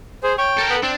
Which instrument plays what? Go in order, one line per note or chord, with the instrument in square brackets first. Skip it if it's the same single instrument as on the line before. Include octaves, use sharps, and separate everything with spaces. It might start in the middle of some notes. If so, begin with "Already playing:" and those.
[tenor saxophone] G#4 [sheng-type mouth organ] C5
[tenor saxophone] C#5 [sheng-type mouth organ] G5
[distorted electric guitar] A4 A#4
[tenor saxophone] B3
[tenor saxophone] C4 [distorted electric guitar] D4